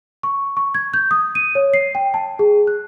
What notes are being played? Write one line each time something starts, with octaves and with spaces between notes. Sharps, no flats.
C#6
C#6
G#6
G6
D#6
D#7
C#5
C7
G5
A5
G#4
F#6